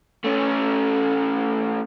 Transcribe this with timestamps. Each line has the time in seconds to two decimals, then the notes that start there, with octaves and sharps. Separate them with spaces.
0.25 A3 C#4